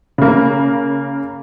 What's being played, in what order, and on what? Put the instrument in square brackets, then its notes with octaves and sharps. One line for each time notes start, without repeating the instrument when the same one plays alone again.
[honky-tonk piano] C#3 A#3